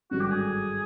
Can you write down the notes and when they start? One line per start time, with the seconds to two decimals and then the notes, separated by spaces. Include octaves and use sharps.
0.11 G#1 G2 D3 F#3 F#4
0.21 G4
0.31 G#4